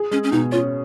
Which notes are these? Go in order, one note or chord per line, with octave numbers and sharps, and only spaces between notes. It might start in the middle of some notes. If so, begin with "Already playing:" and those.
Already playing: G#4
G#3 C#4
C#4
B2 D#4
C#4 F4